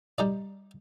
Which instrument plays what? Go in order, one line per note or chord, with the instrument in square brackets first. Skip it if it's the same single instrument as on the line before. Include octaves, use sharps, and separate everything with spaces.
[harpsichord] G3 D#4 D5